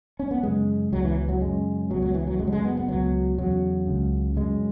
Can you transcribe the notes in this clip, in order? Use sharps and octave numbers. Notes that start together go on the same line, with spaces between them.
C#4
B3
F#2 C#3 G#3
C#2 B2 F#3
E3
F#3
F#2 C#3 G#3
C#2 B2 F#3
F#3
E3
F#3
F#2 C#3 G#3
F#3
G#3
B3
B3
C#2 B2 F#3
E2 C#3 F#3
C#2 C#3
F#2 C#3 G#3